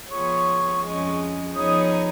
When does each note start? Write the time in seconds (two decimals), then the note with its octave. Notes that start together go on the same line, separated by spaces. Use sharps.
0.11 F3 B3 F4 G#4 C#5 C#6
0.82 F2 C#3 G#3 C#4
1.54 F3 B3 D#4 G#4 C#5 D#6
1.90 A#5